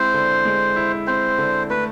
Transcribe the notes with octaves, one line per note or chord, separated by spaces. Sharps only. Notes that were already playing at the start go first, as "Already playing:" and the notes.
Already playing: G#3 C4 E4 C5
D3
G#3
E4
C4 C5
D3
A3 B4